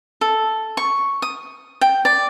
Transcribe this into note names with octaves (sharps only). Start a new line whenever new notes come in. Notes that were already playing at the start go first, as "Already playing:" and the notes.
A4
C#6
D#6
G5
D5